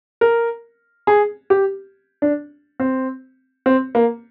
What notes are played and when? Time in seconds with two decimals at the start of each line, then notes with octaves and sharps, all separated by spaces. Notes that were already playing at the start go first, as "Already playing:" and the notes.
0.21 A#4
1.07 G#4
1.50 G4
2.22 D4
2.80 C4
3.66 C4
3.95 A#3